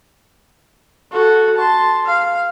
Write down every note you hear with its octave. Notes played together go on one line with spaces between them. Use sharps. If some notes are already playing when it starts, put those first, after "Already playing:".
F#4 A4
A5 C6
F5